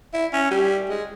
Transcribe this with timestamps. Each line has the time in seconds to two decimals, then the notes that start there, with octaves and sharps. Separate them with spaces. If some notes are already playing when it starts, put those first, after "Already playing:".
0.14 E4
0.33 C#4
0.51 G3
0.90 G#3